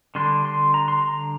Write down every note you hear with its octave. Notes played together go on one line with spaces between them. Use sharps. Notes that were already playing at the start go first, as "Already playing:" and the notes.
D3 G3 D4 C6
C6
A#5
C6
A#5